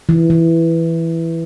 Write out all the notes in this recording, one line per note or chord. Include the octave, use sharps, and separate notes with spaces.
E3
E3